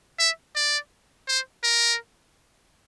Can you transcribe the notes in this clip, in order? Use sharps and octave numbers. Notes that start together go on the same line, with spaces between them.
E5
D5
C5
A#4